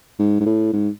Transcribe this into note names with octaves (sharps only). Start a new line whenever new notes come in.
G#2
G#2
A2
G#2